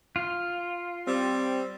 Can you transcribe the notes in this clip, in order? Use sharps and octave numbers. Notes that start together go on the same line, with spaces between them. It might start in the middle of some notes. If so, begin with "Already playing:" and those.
F4
G3 C4